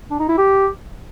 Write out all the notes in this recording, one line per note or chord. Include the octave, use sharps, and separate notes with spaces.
D4
D#4
E4
G4